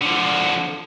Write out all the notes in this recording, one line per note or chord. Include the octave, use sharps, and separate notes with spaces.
D3 F3